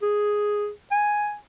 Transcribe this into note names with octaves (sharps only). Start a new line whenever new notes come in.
G#4
G#5